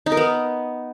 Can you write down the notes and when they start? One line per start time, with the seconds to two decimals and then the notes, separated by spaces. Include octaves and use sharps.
0.06 D#4
0.12 A#4
0.17 B3